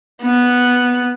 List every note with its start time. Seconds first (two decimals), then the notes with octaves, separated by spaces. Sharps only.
0.22 B3